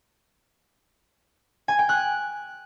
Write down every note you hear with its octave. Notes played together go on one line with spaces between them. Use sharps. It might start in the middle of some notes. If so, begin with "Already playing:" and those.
G#5
G5
F#6